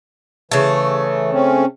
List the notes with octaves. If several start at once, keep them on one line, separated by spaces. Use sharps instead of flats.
C#3 E3 A3
C4 C#4